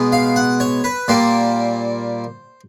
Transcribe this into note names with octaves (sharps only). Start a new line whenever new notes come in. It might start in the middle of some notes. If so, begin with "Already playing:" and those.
Already playing: B2 G#3 B3
F5
F#5
C#5
B4
A#2 G3 A#3 C5